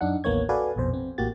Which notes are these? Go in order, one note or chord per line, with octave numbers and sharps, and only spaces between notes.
F#2 D4 D#4 F#5
A1 D#2 A#3 B3 C#5 G#6
F#4 A4 B4 D5 F5 G#5
A#1 F2 B2 C5
C4
A1 A2 A#3 F#4 G4 A6